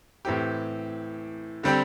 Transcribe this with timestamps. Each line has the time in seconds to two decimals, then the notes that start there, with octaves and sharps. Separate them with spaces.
0.25 A2 E3 C4 G4
1.63 D3 G3 C4 G4